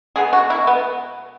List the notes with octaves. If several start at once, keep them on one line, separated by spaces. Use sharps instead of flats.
B2 G#3 B3 G#4
F#4
E4
B3